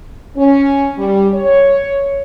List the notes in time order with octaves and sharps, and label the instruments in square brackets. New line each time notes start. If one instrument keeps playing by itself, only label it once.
[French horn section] C#4
G3
C#5